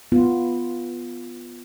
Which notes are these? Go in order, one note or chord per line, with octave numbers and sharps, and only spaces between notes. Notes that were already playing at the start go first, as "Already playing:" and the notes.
B3 F4